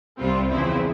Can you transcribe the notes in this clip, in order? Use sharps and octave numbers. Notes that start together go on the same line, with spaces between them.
C2 C3 G3 C4 F4
E2 C#3 F3 C4 E4